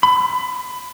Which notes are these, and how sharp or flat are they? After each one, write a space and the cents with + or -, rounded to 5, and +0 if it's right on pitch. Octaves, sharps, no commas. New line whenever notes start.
B5 +25